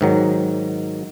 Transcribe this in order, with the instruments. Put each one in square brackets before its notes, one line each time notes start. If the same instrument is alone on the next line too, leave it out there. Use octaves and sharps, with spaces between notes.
[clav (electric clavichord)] G#2 D#3 F#3